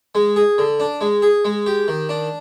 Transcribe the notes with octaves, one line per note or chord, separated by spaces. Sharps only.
G#3
G#4
D3
D4
G#3
G#4
G#3
G4
D#3
D4